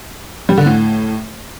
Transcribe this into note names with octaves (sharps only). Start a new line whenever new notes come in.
G3
D3
A2